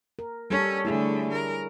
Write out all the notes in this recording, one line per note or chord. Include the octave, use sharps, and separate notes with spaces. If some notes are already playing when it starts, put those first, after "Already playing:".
A#4
G3 C#4 A4 C#5
D3 A3 E4 G#4
A#4